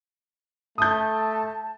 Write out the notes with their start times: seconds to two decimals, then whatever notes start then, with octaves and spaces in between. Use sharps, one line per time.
0.78 A3 A5 D#6 G6